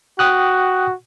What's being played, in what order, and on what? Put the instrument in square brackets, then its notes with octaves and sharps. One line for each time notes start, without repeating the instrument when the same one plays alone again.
[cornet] F#4 [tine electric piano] G5 D#6 F#6